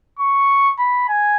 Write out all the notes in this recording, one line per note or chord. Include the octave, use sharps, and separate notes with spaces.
C#6
B5
G#5